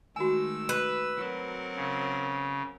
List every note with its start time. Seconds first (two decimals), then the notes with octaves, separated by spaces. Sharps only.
0.16 D#3 G#3 A3 F#4 G#5 E6
0.69 B4
1.17 F#3 C4 A#4
1.76 C#3